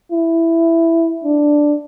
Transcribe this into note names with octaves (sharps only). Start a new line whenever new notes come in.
E4
D4